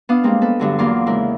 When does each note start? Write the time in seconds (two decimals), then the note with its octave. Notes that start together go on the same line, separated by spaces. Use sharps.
0.09 B3 D4 F5 D#6
0.23 G3 G#3 A#3 C4
0.42 A4 B4
0.59 G2 D3 F#3
0.78 E2 F#3 A#3 F4 C6 D6
1.07 C#3 G#3 E4 A#4